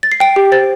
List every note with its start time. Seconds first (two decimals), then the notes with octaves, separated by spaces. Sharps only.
0.03 A6
0.12 C7
0.20 G5 D7
0.36 G4
0.52 C5 A6